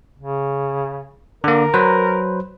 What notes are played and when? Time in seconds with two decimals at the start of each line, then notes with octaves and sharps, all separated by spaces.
0.18 C#3
1.44 D3 A#3 A#4
1.74 F#3 B4 C5